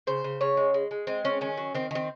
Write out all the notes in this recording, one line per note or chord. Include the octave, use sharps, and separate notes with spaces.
C#3 C5
C#3
C#3 C#5
G#3
G#3
G#3
G#3 C4
C4 C#4
D#3 C#4
F#3
D#3 C4
D#3 C4